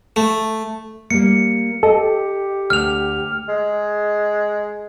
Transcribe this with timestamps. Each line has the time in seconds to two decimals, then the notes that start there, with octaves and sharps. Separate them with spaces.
0.16 A3
1.10 G3 A#3 C#7
1.83 G4 A4 D#5
2.70 D2 F6 F7
3.49 G#3